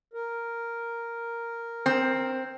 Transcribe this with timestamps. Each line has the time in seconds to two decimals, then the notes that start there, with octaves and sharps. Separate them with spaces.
0.14 A#4
1.86 C4